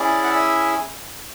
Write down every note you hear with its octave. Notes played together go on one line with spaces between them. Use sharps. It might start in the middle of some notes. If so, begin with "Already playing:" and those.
Already playing: C#4 E4 G#4 D5
F#5
E5 G#5